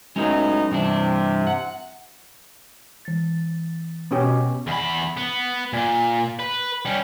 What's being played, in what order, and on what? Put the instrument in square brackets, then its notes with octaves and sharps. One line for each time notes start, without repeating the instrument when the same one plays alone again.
[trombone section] A2 B3 D#4 [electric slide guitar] F#3 G#3 C#4
[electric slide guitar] G2 E3 D4 [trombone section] C3
[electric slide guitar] F#5
[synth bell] E3 A6
[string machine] B2 [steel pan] B3 C#4 G4
[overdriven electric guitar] E2 B5
B3
A#2
B4
G3 C#4